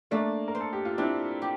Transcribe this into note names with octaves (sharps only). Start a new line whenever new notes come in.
A3 A#3 D4
A#4
C5
A4
G4
F4
C4 D4 E4
G4